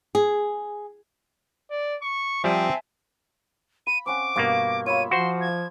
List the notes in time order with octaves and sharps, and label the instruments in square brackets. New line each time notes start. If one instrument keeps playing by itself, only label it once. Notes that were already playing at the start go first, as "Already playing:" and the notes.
[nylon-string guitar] G#4
[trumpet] D5
C#6
[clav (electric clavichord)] F3 G3 D5 [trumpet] C4 [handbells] E5 G#5 A5
[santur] B5 [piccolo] D#7
[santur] C4 C#4 F#5 [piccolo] D6
[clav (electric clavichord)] G2 B2 A#3 [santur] D5 F5 C#6
[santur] F4 E5 B5 [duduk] C#5 [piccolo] D#7
[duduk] F3 [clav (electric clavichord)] F#4 C5 [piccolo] C6
[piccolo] G#6